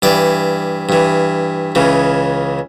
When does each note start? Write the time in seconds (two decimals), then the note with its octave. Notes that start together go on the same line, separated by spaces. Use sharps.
0.02 G2 E3 D5
0.89 G2 E3
1.75 C#2 C#3 E3